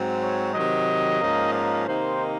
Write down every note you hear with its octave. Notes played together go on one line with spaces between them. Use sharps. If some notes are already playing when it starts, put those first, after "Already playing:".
Already playing: G#2 F#3 C4
C#5
C3 D#3 F#3 D#5
G#2 F3 A#3 C#4
D#5
C3 D#3 A#3 D#4 C5